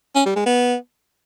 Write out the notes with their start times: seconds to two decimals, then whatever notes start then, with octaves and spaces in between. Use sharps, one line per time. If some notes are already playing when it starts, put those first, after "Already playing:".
0.15 C#4
0.26 G3
0.36 G#3
0.46 B3